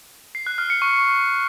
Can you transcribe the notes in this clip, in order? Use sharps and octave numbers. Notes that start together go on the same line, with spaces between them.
C7
F#6
F6
C#7
C#6